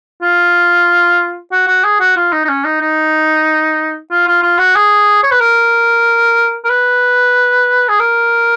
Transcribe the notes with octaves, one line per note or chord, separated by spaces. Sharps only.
F4
F#4
F#4
G#4
F#4
F4
D#4
D#4
C#4
D#4
D#4
F4
F4
F4
F#4
G#4
C#5
B4
A#4
A#4
B4
G#4
A#4